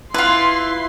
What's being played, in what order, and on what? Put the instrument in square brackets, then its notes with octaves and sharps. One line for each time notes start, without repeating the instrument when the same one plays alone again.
[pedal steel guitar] E4 [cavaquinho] F4 B4 [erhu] C6